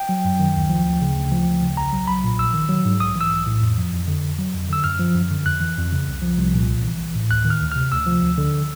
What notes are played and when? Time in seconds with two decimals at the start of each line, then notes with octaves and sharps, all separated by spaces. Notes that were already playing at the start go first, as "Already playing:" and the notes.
Already playing: G5
0.09 F#3
0.24 F#2
0.40 D#3
0.55 D2
0.69 F3
0.85 D2
1.01 C#3
1.15 D2
1.32 F3
1.47 D2
1.62 C#3
1.77 B1 A#5
1.93 F#3
2.07 B1 B5
2.24 A#2
2.38 A#1 E6
2.54 D#3
2.69 F#3
2.85 G#2
3.00 B1 D#6
3.16 E3 E6
3.32 B1
3.47 A2
3.62 F2
3.78 F3
3.92 F2
4.08 D3
4.22 F2
4.38 F#3
4.54 F2
4.69 D3 E6
4.84 F#2 F6
5.00 F3
5.15 F#2
5.31 D3
5.46 F2 F#6
5.61 E3
5.77 F2
5.92 C#3
6.07 C2
6.22 F3
6.38 C2
6.54 A#2
6.68 A#1
6.84 E3
7.00 A#1
7.15 A2
7.29 D2 F#6
7.45 D#3
7.50 F6
7.61 D2
7.72 C3 F6
7.91 D2 E6
8.06 F3
8.22 D2
8.38 D3